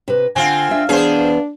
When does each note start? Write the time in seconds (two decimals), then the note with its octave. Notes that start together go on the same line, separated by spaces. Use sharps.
0.08 C3 B4
0.36 D3 C4 F4 F#5 G#5
0.71 D4 E5
0.89 E3 B3 D4 G#4 C5 F5